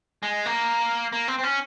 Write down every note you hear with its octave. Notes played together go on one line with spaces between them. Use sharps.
G#3
A#3
A#3
C4
C4
C#4